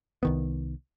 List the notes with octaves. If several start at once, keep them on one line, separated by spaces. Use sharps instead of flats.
C2 D#3 B3